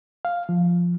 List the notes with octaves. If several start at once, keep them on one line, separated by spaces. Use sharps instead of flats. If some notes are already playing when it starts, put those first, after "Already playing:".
F5
F3